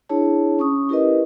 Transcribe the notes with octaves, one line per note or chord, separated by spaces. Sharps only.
D4 E4 G#4 C#5 A5
C#4 C#6 D#6
E4 G4 A#4 B4 D#5